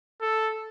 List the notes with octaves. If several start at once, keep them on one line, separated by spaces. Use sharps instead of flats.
A4